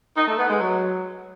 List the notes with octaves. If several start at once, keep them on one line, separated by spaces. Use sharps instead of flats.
D#4
A3
B3
G#3
F#3